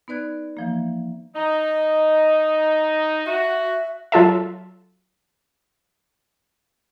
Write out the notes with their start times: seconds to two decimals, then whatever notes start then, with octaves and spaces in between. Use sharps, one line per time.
0.08 B3 D#4 B4 D5 F#6 G#6
0.57 E3 F3 A#3
1.35 D#4 D#5
3.26 F#4 E5
4.12 F#3 F4 A4 E5